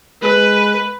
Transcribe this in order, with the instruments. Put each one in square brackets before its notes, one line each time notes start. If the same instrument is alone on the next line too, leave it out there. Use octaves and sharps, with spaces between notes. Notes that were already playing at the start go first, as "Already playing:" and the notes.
[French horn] G#3 [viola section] B4